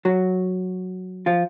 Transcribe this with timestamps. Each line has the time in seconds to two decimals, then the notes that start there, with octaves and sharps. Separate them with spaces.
0.05 F#3 F#4
1.26 F3 F4